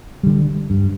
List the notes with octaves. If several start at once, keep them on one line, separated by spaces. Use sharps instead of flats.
D3 G3
G2